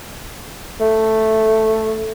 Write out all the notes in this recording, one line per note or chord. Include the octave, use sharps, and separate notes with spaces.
A3